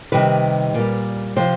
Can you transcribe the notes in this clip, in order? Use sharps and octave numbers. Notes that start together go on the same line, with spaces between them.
C3 D#3 G3 B4
A#2 G3
C3 F3 C5